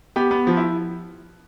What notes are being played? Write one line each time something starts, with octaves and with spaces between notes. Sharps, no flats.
B3 G4
B3
F3
E4